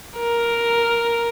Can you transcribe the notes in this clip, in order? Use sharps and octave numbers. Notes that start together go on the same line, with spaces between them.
A#4